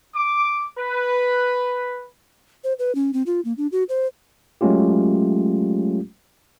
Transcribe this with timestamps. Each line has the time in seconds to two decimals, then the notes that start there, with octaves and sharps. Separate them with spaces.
0.15 D6
0.78 B4
2.64 C5
2.79 B4
2.95 C#4
3.13 C4
3.26 F4
3.45 A#3
3.58 D4
3.72 F#4
3.89 C5
4.61 F#3 G#3 A3 C#4 F4 G4